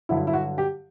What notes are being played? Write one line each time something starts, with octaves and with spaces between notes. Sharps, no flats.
G2 D3 F#3 E4
E4
F#4
G4